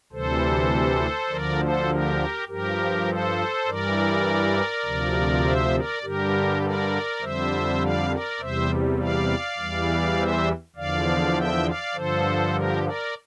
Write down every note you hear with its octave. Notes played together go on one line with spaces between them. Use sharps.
D2 C3 E3 G3 A4 C5
D2 D3 F3 A#4 D5
A4 C5
G4 A#4
G2 F3 G4 A#4
A4 C5
G2 E3 G3 A#4 D5
D2 C3 F3
C5 E5
A#4 D5
G2 D3 G3 G4 A#4
A#4 D5
F2 D3 G3 C5 E5
D5 F5
A#4 D5
E2 C3 G3 C5 E5
D5 F5
E2 E3 G3
C5 E5
E2 D3 F3 D5 F5
E5 G5
D5 F5
G2 D3 F3 A4 C5
G4 A#4
A#4 D5